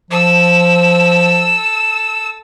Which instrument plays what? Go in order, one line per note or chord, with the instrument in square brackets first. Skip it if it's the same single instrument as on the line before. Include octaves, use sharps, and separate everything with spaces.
[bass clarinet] F3 [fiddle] A4 E6